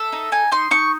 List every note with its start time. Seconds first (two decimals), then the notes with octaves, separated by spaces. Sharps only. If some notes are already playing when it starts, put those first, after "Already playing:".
Already playing: A4 E5
0.12 D#4
0.32 D#4 G#5
0.52 D#4 C6
0.71 D#4 C#6